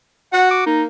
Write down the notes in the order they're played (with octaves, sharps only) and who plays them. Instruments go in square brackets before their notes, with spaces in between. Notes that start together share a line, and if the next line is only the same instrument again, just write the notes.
[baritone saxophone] F#4 [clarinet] F#5
[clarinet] D6
[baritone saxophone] A#3 [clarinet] D#4